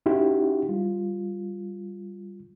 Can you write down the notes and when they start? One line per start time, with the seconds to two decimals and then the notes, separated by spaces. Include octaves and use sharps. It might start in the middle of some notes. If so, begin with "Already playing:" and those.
0.06 C#4 D#4 E4 F#4 G4
0.69 G3 F4